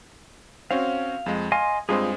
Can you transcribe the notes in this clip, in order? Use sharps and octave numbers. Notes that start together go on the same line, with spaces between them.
C4 C#4 F#4 F5
F2 G#3
D#5 F5 G#5 C6
G2 G#3 C4 F4 G#4